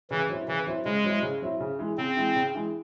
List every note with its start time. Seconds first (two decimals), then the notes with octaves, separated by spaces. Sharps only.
0.11 C#3 E3
0.29 F#3 C4 E4
0.47 C#3 E3
0.66 F#3 C4 E4
0.85 C#3 G#3
1.04 F#3 C4 E4
1.22 C#3
1.42 F#3 C4 E4
1.60 C#3
1.79 E3 G#3
1.98 C#3 C4
2.17 E3 G#3
2.36 C#3
2.55 E3 G#3